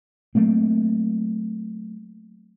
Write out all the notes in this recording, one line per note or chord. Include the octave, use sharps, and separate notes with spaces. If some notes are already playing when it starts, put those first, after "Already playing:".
F#3 A3 A#3 C4